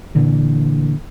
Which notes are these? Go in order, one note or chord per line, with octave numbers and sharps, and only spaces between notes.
A#2 D3 E3